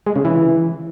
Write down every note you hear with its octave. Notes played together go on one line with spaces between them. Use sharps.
G#3
C#3
E3